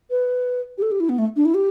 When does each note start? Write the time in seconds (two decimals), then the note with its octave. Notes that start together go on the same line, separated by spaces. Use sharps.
0.10 B4
0.78 G4
0.82 A4
0.91 G4
1.00 E4
1.09 B3
1.18 A3
1.36 D4
1.45 E4
1.54 G4